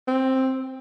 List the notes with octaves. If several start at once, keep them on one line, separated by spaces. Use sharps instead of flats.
C4